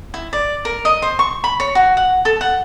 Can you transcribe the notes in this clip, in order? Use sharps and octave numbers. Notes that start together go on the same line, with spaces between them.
E4
D5
A#4
D#5
C5
C#6
B5
C#5
F#4
F#5
A4
F#5